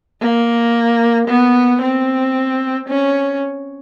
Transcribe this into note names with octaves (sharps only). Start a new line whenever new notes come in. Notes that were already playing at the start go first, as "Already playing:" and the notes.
A#3
B3
C4
C#4